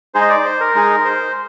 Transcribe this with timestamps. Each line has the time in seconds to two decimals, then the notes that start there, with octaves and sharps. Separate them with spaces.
0.14 G#3 D#4 G#4 C5
0.21 D#5
0.30 D5
0.45 C5
0.60 A#4
0.75 G#3 D#4 G#4
1.05 C5